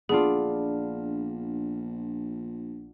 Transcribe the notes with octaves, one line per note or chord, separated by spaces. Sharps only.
A#1 B3 D4 F4 G#4